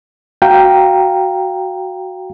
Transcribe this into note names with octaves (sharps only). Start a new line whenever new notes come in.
F#4 F5 G5 A#5